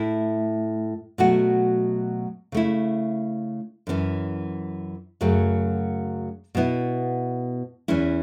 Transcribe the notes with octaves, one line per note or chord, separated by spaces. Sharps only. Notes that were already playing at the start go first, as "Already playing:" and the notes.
Already playing: A2 A3 E4
B2 F#3 A3 F#4
C#3 A3 E4
F#2 E3 C#4
F#2 C#3 F#3 A3
B2 B3 E4
E2 E3 C#4 E4